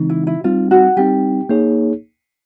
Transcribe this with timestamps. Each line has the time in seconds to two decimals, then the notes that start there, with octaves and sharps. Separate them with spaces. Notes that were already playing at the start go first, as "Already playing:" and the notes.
Already playing: C#3 E3 G#3 C4 D#4
0.10 E4
0.27 E4
0.44 G3 C4 D#4 F4
0.71 F#4
0.97 G3 C4 D#4 G4
1.49 A#3 D#4 G#4 C#5